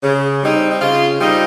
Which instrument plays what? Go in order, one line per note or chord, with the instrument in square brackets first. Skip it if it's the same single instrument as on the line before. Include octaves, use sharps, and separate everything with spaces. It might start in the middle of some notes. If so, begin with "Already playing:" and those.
[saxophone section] C#3
G3 C4 D#4
D#4
C#3 F4
G3 C4 D#4 F4